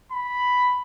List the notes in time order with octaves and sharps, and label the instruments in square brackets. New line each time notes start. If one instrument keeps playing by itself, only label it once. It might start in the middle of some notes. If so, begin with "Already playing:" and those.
[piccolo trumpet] B5